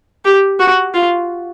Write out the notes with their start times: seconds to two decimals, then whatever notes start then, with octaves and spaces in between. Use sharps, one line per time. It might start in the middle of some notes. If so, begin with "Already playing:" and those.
0.25 G4
0.60 F#4
0.95 F4